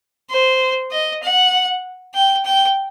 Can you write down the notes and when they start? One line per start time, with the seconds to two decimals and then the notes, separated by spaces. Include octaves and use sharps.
0.30 C5
0.91 D#5
1.22 F#5
2.14 G5
2.45 G5